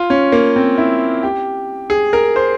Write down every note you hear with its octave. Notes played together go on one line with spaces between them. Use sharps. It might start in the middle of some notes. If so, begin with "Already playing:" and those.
Already playing: F4
C#4
A#3
C4
E4
G4
G#4
A#4
C5